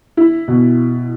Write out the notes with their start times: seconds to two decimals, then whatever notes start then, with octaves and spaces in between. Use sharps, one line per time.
0.17 E4
0.48 B2